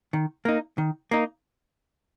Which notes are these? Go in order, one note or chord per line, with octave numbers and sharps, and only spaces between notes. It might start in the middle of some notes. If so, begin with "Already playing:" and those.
D#3
A#3 D#4
D#3
A#3 D#4